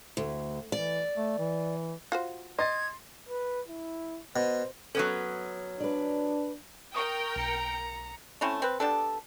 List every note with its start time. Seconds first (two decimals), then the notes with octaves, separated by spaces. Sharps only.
0.17 D2
0.72 E3 D5
1.17 A3
1.38 E3
2.12 F4 F#4 C5
2.59 D#5 C6 G#6 A6
3.29 B4
3.68 E4
4.36 B2 C5
4.95 F#3 B3 C#4 A4
5.80 D4 B4 D5
6.94 A#4 G5 C#6 D#6
7.36 B1 A#5 C#7
8.41 A3 C4 C#4 E4
8.62 C4 B4
8.80 G3 B3 D4 A4